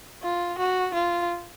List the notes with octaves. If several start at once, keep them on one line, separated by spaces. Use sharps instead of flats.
F4
F#4
F4